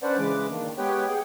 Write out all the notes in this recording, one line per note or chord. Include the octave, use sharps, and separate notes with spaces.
C#4 D4 B4 C5 D5 F#5
C#3 E3 G#3 B4 D6
D#3 A#3 D4
G#3 B3 G4 B4 C#5 G5
G#4 F#5 G5